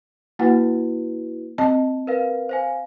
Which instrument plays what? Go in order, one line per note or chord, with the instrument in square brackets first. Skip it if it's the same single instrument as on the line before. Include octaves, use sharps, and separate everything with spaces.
[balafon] A#3 F#5 [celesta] E4 F#4 B4
[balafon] C4 D#5 A5
[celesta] A#4 B4 F5
C5 F5 G#5